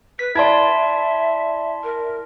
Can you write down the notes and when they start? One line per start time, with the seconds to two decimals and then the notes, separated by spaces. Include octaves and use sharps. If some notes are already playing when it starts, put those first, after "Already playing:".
0.19 B4 B6
0.35 E4 D5 E5 A5 C6 G#6
1.84 A#4